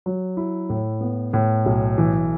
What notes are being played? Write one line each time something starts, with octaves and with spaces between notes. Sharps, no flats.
F#3
E4
A2
B3
A2
B1
E3